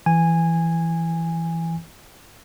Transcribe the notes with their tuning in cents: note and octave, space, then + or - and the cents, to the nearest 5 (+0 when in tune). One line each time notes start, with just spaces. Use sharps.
E3 +10 G#5 -10